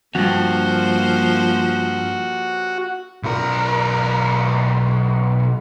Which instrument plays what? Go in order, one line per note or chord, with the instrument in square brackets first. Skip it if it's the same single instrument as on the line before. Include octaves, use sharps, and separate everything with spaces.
[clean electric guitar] E2 G2 [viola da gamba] F3 A#3 C5 [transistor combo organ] F#4
[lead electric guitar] B1 A#4